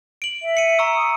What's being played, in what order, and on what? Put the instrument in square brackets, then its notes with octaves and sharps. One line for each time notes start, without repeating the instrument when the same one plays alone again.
[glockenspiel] D7 F#7
[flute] E5
[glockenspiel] C#7 D#7
A#5 C#6 E6
[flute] D#6